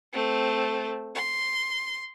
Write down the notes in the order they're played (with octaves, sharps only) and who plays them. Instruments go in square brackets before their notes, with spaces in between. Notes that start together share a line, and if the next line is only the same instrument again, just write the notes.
[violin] A3 C4
C6